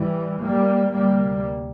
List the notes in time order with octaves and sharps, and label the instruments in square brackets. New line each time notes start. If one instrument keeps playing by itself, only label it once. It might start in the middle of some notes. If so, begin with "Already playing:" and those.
Already playing: [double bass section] E3 G3
G3 A#3
D2 C3 G3 A#3